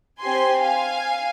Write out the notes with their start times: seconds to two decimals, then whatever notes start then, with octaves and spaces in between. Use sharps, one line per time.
0.21 C4 G4 G#5 C6
0.63 F5 G#5